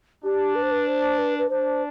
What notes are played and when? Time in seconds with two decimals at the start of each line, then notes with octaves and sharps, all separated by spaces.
0.24 D4 G4
0.55 B4
0.62 C5
0.71 B4
0.87 C5
1.18 B4
1.38 B4
1.49 D4 C5